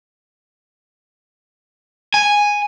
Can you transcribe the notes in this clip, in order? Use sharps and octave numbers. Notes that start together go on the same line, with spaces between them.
G#5